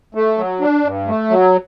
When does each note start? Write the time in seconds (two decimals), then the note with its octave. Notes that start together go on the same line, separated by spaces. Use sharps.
0.15 A3
0.38 F#3
0.61 D4
0.84 G2
1.07 A3
1.30 F#3